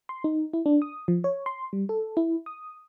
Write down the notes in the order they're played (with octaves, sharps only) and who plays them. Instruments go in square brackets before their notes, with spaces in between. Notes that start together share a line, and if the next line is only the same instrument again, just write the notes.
[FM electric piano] C6
D#4
E4
D4
D#6
F3
C#5
C6
G3
A4
E4
D#6